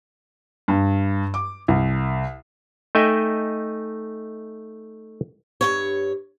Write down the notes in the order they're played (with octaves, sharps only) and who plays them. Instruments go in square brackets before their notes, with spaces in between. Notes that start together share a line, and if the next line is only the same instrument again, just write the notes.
[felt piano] G2
D6
C2
[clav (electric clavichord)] A3 D#4 D#5 E5 G5 G#5
[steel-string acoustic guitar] G2 A#2 C#5